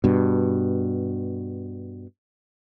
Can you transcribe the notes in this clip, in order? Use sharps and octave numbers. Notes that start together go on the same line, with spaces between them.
G2 B2